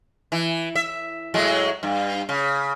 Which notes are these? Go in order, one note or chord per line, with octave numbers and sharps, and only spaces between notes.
E3
E5
A2 F#3 G#3
G2
C#3